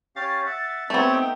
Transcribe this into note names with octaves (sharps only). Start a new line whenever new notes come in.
C#4 G4 F5 A6
E5 F#5
A3 B3 C4 G4 C#5 A5
D#4 G5